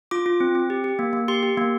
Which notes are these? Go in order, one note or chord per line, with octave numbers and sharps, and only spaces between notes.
F4 D6
F4
C4
C4
G4
G4
A#3
A#3
G4 C6
G4
A#3